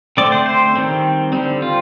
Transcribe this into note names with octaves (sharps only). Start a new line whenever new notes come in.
D3 A3 C4 D5
C5
C5
D#3 G3 C4
D3 G3 C4
F4